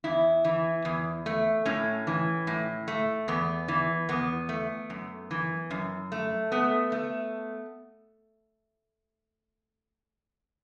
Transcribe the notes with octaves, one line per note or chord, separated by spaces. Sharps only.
E2 E4
E3
E2
A3
A2 C#4
E3
A2
A3
E2 B3
E3
E2 B3
A3
F#2
E3
F#2
A3
A3 B3
A3